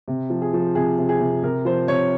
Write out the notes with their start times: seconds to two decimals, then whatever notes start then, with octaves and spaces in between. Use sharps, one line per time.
0.08 C3
0.30 F3
0.42 G#4
0.53 F3
0.75 C3 G#4
0.98 C3
1.09 G#4
1.20 C3
1.43 C3 A#4
1.65 F3 C5
1.87 C3 C#5